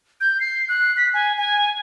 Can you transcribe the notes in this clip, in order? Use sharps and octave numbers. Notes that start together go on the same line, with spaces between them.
G6
C7
F#6
B6
G#5
G#5